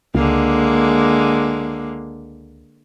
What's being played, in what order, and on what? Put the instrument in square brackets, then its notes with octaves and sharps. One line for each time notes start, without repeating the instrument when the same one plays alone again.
[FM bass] C#2 [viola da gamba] D3 G#3 A#3